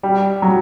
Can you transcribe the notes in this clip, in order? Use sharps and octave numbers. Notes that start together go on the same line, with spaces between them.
G3
F#3